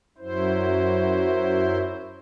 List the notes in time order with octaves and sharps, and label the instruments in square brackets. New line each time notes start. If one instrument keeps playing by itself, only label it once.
[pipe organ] F#2 F#3 E4 C5